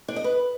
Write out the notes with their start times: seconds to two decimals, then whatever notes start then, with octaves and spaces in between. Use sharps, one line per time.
0.08 D4
0.16 D#5
0.24 B4